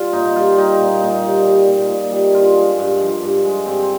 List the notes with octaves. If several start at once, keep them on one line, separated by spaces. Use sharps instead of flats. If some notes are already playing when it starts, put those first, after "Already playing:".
Already playing: G3 F4
A#2 D#4
D#4
G3 F4
G3 D#4
A#2
A#2 D#4
G3
G3
A#2
A#2
G3
G2 F4
G#3
G2
F3
G2
G#3
G2 C4